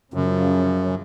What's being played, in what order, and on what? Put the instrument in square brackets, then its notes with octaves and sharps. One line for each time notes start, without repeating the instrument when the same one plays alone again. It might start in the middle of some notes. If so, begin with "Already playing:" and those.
[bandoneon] F#2 [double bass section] C#3 F3